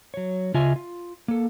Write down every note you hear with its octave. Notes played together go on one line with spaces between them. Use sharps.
F#3 C#5
C#3 F4 D#5 E5 G#5
F4
A#3 A4